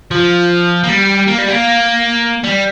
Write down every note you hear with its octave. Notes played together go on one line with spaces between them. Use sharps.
F3
A#3
G3
A#3
G3
A#3
G3